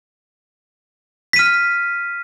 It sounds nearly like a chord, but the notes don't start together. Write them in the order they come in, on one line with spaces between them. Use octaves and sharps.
B6 D#7 F6